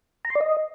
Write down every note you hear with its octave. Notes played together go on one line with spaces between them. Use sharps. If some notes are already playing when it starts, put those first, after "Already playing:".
A#5
C6
D5
D#5